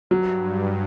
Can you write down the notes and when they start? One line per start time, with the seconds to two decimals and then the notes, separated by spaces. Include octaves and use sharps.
0.10 G2 F#3